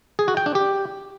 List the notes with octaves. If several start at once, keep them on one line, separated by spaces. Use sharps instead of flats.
G#4
F#4
G5
D4
G4